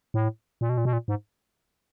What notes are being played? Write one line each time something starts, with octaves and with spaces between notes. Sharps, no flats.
A2
A#2
B2
A#2
B2
A#2
G#2